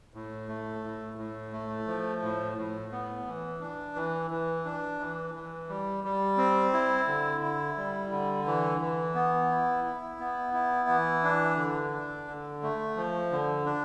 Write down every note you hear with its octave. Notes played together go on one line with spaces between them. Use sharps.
A2
A3
A2
A2
A3
F3
A2
A2
B3
E3
D4
E3
E3
D4
E3
E3
G3
G3
C4
E4
D3
E4
G3
D3
E3
E3
B3
E4
E4
B3
E4
E3
D4
D3
D4
D3
A3
F3
D3
D4